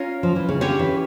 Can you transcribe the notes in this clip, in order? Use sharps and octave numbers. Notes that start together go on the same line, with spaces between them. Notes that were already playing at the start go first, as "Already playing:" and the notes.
Already playing: C#4 F4 A#4
F3
E3
C#3
D3 C#4 G4 C#5
E3